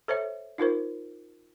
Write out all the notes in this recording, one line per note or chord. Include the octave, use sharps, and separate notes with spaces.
A4 C5 C#5 E5
D#4 F4 A#4 C5